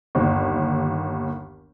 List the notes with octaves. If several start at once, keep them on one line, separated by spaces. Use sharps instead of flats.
G1 D#2